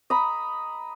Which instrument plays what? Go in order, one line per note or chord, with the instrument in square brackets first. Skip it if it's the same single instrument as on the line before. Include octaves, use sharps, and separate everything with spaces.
[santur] D#5 A#5 B5